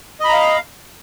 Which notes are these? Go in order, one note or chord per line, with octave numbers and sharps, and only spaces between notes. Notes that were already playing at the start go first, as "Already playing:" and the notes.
D#5 F5 A#5 B5